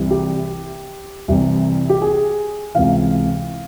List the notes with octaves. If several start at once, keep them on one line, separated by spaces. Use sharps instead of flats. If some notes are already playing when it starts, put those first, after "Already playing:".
Already playing: C2 C3 E3
G4
C2 C3 E3
G4
G#4
C#2 C3 E3 F5